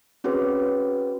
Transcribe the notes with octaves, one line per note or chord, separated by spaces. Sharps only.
C4 C#4 F#4 G#4 B4 C#5